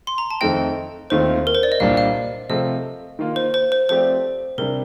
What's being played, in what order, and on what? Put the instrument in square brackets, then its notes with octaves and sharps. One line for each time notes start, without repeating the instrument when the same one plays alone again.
[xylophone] C6
A#5
A5
[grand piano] F2 D#3 A3 C4 D#4 [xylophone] D#5 G5
[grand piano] D#2 D#3 A3 C4 F4 [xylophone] C5
[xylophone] A#4
C5
D5
D#5
[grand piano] C2 A#2 G3 D4 [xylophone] F5
[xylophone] F5
[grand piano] C3 F3 A3 [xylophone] D#5
[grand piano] D#3 A#3 F4
[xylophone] C5
C5
C5
[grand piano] F3 A3 C4 G4 D5 [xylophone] C5
[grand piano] C3 G3 D4 [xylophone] A#4